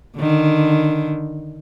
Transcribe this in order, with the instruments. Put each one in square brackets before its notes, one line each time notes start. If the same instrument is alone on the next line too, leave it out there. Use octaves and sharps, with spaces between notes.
[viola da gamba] D3 D#3